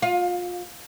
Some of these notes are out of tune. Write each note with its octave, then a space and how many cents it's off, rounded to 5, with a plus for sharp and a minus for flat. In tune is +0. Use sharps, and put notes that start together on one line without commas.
F4 +25